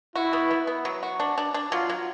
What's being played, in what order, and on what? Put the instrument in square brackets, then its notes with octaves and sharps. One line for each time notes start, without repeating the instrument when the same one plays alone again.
[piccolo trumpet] E4 [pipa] F#4
[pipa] B3
B3
B3
F#3
F#4
D4
D4
D4
[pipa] F#3 [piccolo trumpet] F4
[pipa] F#3